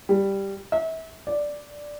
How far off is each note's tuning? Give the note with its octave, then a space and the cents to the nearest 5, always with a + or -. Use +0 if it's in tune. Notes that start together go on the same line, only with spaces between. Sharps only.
G3 +5
E5 -35
D5 +0